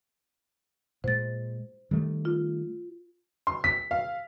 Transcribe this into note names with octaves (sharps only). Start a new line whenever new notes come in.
A#2 G#3 C5 A6
D#3 G3 A3
F4
C6
B6
F5